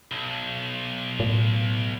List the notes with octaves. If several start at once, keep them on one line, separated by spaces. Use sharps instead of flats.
B1
A2